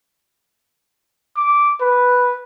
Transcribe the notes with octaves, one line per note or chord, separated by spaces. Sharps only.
D6
B4